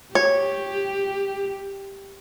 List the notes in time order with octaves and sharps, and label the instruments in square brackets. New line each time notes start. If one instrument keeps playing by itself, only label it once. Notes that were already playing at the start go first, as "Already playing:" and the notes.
[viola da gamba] G4 [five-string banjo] C#5